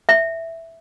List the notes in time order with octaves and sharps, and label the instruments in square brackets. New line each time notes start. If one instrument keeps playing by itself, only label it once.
[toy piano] E5